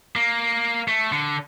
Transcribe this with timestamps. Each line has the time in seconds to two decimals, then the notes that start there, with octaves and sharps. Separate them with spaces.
0.16 A#3
0.88 A3
1.12 D3